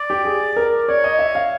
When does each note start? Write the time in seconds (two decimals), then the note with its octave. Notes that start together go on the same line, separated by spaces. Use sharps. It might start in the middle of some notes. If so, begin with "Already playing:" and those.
Already playing: D5
0.10 G4
0.25 G#4
0.56 A#4
0.88 C#5 D5
1.04 D#5
1.19 E5
1.35 F5